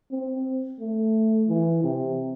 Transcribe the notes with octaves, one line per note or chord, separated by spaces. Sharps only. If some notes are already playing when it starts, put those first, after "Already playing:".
C4
A3
E3
C3